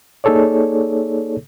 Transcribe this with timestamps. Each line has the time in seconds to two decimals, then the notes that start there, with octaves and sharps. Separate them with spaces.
0.24 A#3 D#4 G#4 A4 C#5 D5